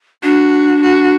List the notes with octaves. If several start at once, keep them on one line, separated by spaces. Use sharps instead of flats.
D4 F#4
F#4